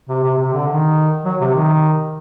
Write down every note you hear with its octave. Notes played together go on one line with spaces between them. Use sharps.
C3
C3
C3
D3
D#3
F#3
C3
D#3